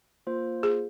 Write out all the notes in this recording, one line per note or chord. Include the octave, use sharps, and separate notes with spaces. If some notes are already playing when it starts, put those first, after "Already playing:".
A#3 F4 C5
G#4